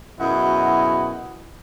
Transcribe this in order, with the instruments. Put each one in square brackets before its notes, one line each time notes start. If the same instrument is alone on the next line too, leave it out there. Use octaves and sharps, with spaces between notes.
[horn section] F#2 B2 E4 F#4 G#4 D#5